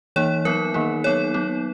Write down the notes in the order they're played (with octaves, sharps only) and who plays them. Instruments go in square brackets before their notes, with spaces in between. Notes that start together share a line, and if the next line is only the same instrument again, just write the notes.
[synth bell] E3 A#3 D#4 C#5
F#3 B3 D#4 A#4
D#3 A#3 D#4
F#3 B3 D#4 C#5
F#3 B3 D#4